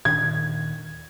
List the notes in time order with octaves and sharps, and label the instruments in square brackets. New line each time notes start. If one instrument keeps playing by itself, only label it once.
[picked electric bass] D#1 A#2 D#3 [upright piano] G#6